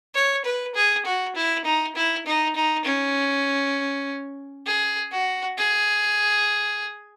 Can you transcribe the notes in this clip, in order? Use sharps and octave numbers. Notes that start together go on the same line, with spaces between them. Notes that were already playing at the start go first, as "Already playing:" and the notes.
C#5
B4
G#4
F#4
E4
D#4
E4
D#4
D#4
C#4
G#4
F#4
G#4